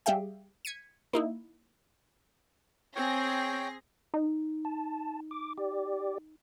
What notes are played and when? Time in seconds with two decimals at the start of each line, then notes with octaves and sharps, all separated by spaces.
0.06 G3 G4 G#4 E5 F5 G5
0.65 G#6 B6 C#7 D#7
1.13 A#3 D#4 E4
2.96 C4 G#4 C#5 G5 A#6 C7
4.14 D#4
4.65 A5
5.31 D6
5.58 G4 D5